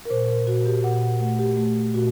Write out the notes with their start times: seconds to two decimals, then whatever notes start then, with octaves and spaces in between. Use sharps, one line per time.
0.05 A#4
0.10 A#2 C5
0.28 A#4
0.46 A#2 F#4
0.66 G4
0.84 A#2 F#5
1.03 F#5
1.20 A3 F#5
1.39 G4
1.57 A3
1.94 A#2 F#4